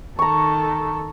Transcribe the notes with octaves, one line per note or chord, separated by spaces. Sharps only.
D#3 A4 A#5 C#6